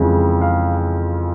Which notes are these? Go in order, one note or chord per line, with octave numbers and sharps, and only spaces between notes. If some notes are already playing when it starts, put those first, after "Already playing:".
Already playing: F2 C#3 E3 G#3
F5